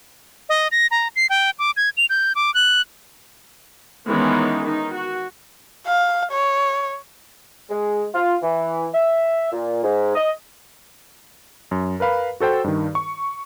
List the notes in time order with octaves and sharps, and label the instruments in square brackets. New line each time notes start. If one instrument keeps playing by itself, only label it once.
[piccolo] D#5
A#6
A#5
C7
G5
D6
G#6
F7
G6
D6
F#6
[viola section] D#3 E3 G#3 B3 C#4 D#4
D#3 D#4
F#4
[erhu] F5
C#5
[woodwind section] G#3
F4
E3
E5
A#2
G#2
D#5
[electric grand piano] F#2
A#4 B4 F5 B5
F#4 A4 C5 G5
G2 D#3
C#6